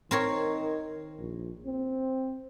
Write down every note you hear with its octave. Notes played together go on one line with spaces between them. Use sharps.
D#3 C4 A#4 C#5
A#1
C4